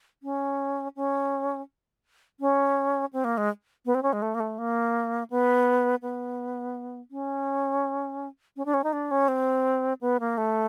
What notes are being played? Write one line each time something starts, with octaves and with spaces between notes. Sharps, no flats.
C#4
C#4
C#4
C4
A#3
G#3
B3
C4
C#4
G#3
A3
A#3
A3
A#3
B3
B3
C#4
C#4
D4
C#4
D#4
D4
C#4
C4
B3
A#3
A3